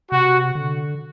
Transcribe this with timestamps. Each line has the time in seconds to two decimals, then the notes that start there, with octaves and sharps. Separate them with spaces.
0.11 C3 F#4
0.55 D3